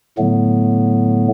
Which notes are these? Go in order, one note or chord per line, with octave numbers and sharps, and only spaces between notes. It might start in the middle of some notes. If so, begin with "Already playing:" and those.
A2 D3 F#3 A3 B3